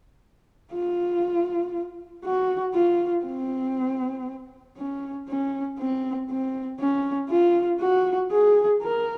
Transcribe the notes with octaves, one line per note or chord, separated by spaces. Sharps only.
F4
F#4
F4
C4
C#4
C#4
C4
C4
C#4
F4
F#4
G#4
A#4